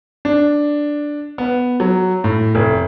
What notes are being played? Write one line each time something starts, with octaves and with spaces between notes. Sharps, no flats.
D4
B3
F#3
A2
F1